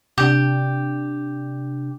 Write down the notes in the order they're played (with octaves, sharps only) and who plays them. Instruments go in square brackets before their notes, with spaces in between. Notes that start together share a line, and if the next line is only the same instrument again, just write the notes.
[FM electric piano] C3 D4 [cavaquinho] G4